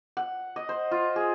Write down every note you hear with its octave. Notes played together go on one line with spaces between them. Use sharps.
F#5
D#5
C5
F4
G#4